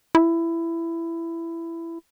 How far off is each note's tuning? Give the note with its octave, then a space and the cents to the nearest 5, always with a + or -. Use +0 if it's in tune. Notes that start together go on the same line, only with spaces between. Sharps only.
E4 +15